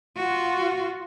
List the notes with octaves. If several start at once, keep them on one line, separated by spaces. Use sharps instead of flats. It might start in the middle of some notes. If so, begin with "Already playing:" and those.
F4 F#4